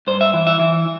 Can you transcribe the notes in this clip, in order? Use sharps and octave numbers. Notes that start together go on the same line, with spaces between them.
G2 C5
E5
E3
E5
E3